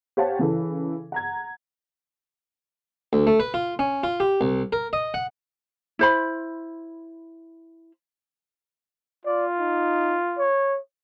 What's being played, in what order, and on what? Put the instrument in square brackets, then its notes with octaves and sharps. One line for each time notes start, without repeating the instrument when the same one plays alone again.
[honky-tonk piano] G4 C5 C#5 F5 F#5 A5
C#3 E3 A4
F#5 A#5 G#6
[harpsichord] D2
A3
B4
F4
C#4
F4
G4
C2
A#4
D#5
F#5
[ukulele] E4 C5 B5
[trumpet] F4 [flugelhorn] D5
[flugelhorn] D#4
C#5